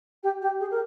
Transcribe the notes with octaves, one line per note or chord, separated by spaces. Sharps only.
G4
G4
G#4
A#4